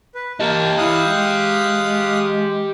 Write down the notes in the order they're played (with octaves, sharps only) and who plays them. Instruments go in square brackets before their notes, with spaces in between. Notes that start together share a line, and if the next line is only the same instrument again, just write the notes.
[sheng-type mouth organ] B4
[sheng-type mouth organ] A#3 A5 [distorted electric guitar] G4 D#5
[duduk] E4 [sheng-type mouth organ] F5 D#6 F#6
[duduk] G#3